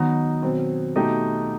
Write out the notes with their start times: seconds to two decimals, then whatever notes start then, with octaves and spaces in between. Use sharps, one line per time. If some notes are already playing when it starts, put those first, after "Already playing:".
Already playing: D#3 F#3 B3 D#4 F#4
0.42 B2 F#3 C4
0.95 B2 A3 D#4 G4